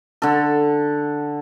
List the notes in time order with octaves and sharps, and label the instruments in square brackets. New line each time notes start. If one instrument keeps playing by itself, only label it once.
[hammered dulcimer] D3 A4